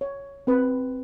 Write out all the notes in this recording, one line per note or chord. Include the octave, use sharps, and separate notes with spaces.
C#5
C4 B4